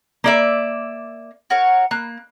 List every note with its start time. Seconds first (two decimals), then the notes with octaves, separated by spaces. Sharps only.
0.24 A#3 D5 E5
1.50 F#4 A#4 C#5
1.91 A#3 F#6